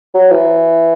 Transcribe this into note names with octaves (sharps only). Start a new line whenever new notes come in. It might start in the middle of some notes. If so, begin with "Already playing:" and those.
F#3
E3